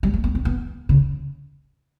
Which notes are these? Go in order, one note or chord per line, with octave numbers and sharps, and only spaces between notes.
G3
A3
B3
C4
B3
C#3